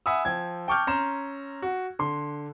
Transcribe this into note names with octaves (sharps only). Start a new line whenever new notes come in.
E5 F#5 G#5 B5 D#6 E6
F3 G5 G#6
G5 A5 C#6 D6 F6 G6
C#4 A#5 C6 E7
F#4
D3 C6